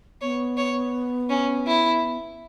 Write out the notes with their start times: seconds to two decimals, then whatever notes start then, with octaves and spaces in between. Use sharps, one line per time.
0.21 B3 C#5
0.57 C#5
1.30 C#4
1.67 E4